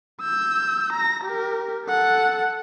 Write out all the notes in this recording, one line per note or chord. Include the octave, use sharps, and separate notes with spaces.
E6 G6
A#5 A#6
G4 A#4
A4 F#5